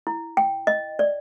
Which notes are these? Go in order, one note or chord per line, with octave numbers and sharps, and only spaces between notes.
E4
G5
D#5
D5